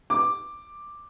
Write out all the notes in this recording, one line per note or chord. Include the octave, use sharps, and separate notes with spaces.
D6